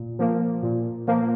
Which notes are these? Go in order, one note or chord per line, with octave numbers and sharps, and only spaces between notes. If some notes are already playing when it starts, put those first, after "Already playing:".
Already playing: A#2
F3 A#3
A#2
F3 A#3